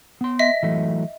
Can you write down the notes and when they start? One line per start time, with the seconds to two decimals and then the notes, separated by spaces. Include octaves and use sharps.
0.21 B3 C6
0.39 D#5 E5 B6
0.63 E3 F#3 A3